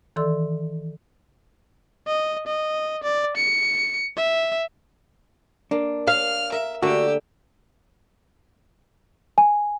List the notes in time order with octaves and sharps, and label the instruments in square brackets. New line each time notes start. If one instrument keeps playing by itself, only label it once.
[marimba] D#3 E3 A4 D5 C6 E6
[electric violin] D#5
D#5
D5
C#7
E5
[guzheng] A#3 [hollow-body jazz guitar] D4
[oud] F5 [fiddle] F6
[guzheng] A#4 [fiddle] E5
[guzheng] D3 A3 A#3 [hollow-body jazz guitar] F#4 [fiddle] G4 E6
[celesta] G#5